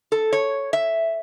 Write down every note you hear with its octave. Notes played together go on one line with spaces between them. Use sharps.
A4
C#5
E5